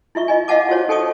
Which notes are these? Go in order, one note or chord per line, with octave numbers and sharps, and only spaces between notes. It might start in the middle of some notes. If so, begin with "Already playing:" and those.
E4 F4 E5 C#6
F4 D#5 G#5
E4 D#5 F5 F#5 A5 D6
F4 F#4 C5 C#5
D#4 A4 G5 A5 C#6 D#6